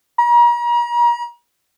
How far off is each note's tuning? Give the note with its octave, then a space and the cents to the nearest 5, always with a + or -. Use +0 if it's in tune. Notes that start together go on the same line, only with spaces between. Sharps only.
A#5 +40